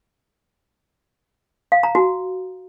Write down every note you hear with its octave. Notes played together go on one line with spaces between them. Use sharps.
F5
A#5
F#4